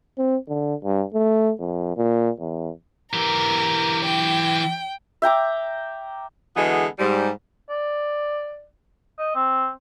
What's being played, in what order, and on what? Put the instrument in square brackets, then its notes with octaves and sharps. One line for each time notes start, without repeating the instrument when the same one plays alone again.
[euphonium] C4
D3
G2
A3
F2
A#2
E2
[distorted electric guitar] E3 G4 [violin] A#4
[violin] G5
[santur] E5 G5 A#5 D6
[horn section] D3 E3 G#3 B3 F#4 G#4
G#2 G3
[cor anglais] D5
D#5
C4